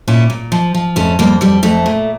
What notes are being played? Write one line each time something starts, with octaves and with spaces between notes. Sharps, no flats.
A#2 C#4 E4
A#2
F3
F3
F2 A3 C#4
F2 G3 A#3
F2 G3
F2 A3
A#2